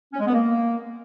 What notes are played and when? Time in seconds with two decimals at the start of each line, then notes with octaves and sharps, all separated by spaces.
0.13 C#4
0.20 G#3
0.26 B3
0.33 A#3